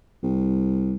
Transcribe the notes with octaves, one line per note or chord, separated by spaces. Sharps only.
C2